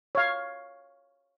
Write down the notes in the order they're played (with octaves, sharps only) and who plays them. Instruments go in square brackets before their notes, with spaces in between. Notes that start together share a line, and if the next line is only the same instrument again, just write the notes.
[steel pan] C#5 F5